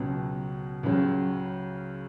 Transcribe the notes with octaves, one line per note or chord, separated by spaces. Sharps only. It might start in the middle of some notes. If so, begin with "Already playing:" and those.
Already playing: C#2 B2 F#3
C#2 C#3 F#3 C#4